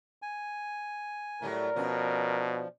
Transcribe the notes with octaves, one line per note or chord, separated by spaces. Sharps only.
G#5
A2 F#3 G3 A3 A#4
B2 F3 C#4 D4